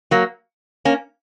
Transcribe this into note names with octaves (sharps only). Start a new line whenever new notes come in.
F#3 A#3
A#3 C#4